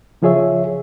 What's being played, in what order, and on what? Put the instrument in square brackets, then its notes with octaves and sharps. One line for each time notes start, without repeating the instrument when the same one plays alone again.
[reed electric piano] C#3 F3 F4 G#4 C#5 E5